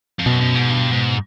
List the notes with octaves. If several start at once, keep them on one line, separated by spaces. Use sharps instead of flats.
F2
F#2 B2
F#2
G#2
G2
G#2